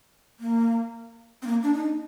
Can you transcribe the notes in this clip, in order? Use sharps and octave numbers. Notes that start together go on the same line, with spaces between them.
A#3
C4
A#3
D4
D#4